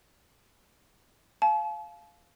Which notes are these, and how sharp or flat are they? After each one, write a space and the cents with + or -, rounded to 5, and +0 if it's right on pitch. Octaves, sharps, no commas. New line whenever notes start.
F5 +0 A5 -45